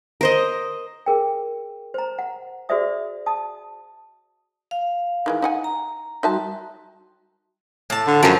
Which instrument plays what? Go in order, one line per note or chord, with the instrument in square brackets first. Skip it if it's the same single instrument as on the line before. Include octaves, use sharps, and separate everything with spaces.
[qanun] A#4 C5 D#5
[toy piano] G#4 A#4 G5
C5 A#5
F#5
F#4 G#4 C5 D5 E5 D#6
A5 D#6
[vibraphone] F5
[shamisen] D#3 E3 G#3
D#4 F#5 G#5
[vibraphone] A#5
[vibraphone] G3 F#4 C6 [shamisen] D#4 E5 A5
[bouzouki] A2 A5
[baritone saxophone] D3
[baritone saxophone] F#2 [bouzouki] F3 F#3